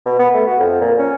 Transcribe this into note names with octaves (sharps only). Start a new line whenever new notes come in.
B2
B3
A3
F#4
F2
A#2
C#4